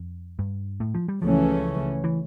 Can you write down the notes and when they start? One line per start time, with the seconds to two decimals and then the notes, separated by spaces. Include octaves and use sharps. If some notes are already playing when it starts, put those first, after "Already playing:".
Already playing: F2
0.39 G2
0.80 A2
0.95 F3
1.08 G3
1.22 C#2 C#3 E3 F3 A3 C#4
2.04 E3